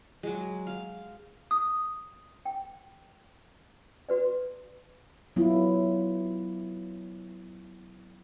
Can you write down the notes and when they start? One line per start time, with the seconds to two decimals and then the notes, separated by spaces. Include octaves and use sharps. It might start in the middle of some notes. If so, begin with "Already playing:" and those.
0.23 F#3 G#3
0.67 F5
1.51 D#6
2.45 G5
4.09 F#4 B4 D5
5.36 F#3 B3 E4 F4